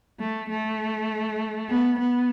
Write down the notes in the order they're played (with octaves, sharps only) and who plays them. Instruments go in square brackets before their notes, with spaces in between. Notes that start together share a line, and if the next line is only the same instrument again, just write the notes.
[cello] A3
A3
B3
B3